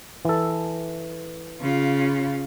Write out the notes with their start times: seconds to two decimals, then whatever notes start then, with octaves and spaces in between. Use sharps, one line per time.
0.25 E3 A4
1.61 C#3 F4